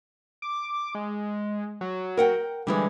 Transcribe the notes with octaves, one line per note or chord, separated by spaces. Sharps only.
D6
G#3
F#3
A#4 F#5 G5
D3 E3 G3 G#3